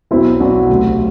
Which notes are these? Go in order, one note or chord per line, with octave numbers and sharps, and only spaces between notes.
B1 B2 F#3 C4 E4
B1 B2 F#3 D4 F#4
D2 C3 F#3